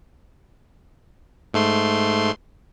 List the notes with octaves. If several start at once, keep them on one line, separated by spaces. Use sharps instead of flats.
G#2 A3 C6